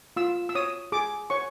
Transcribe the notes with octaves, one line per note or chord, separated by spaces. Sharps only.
F4 E6
E6
C#5 D#6
G#4 D6
C#5 C#6